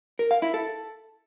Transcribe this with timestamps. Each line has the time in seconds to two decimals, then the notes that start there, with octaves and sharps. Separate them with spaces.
0.19 A#4
0.31 F5
0.42 E4
0.54 A4